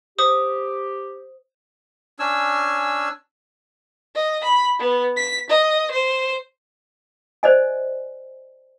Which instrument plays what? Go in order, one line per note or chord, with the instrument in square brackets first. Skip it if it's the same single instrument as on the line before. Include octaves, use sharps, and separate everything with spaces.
[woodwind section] G4 [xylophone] C5 D#6
[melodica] C#4 D4 G#5 E6
[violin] D#5
B5
B3
B6
D#5
C5
[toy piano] C5 D5 D#5 G#5